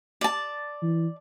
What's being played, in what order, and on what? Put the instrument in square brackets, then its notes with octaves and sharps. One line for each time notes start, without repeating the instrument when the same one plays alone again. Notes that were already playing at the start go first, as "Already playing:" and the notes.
[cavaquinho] D5 A5
[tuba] E3